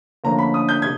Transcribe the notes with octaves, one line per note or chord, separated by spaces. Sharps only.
D2 D3 F3 A#3 C#4 A#5
B5
D#6
G6
C3 G#6